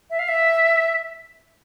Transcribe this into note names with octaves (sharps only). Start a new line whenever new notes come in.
E5
F5
E5